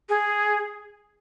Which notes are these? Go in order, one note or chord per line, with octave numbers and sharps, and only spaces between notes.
G#4